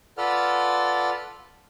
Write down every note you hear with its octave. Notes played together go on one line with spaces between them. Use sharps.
F4 A4 B4 D5 F#5 F6